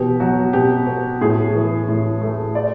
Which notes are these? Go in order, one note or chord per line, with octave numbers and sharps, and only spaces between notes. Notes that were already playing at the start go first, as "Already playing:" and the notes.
Already playing: B2 E3 G4
F#3 F#4
B2 G4
B3
A2 G#4
E3
A2
A3
D5